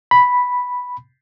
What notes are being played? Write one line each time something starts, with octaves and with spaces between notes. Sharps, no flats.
B5